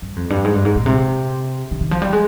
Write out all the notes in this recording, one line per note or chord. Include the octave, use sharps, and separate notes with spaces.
G2
F2
G2
G#2
G2
G#2
A#2
C3
D3
D#3
F3
G3
G#3